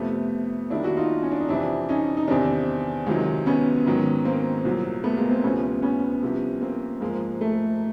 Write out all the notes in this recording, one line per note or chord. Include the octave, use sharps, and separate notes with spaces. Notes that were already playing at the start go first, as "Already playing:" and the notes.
Already playing: F2 C3 F3 A3 B3
D#2 D#3 G3 D4 E4
E4 F#4
D#4 F4
C#4
D4
D#4
F2 C3 E3 D4 E4
C#4 D#4
D#4
E2 C3 D#3 C4 D4
C#2 C3 D#3 F#3
B3 C#4
G#2 D#3 F#3
A#3 C4
C2 A#2 F#3
A3 B3
G#3 A#3
A#3 C4
D2 C3 F3 B3 C#4
B3 C#4
C2 C3 F3
A#3 C4
G#2 F3 G#3 A#3
A3